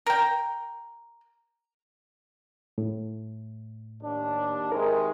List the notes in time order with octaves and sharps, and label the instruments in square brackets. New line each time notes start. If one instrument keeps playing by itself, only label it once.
[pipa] A#4 G5
[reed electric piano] A2
[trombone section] D#2 D4
[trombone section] C3 D#3 G#3 [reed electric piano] A#4